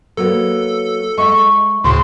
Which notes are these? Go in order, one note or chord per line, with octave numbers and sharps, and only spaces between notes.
F#3 A#3 B3 A4
G#3 E5 F#5 C#6
D2 A2 C#3 C6